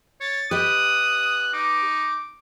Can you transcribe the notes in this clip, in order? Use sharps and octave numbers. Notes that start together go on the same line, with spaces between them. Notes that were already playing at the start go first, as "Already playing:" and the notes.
C#5 A6
G4 B4 D#5 D#6 F#6
D#4 D6